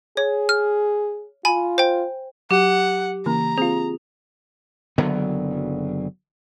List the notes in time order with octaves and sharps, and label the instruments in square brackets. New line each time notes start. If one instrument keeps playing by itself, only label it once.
[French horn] G#4 [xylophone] C#5
[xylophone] F6
[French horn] F4 [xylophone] G#5 B5
[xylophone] C5 G5
[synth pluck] F#3 [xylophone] G4 [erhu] F#5
[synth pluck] C#3 E3 A#3 [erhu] A#5
[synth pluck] C4 F4 [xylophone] G#4
[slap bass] F#1 D3 F#3 B3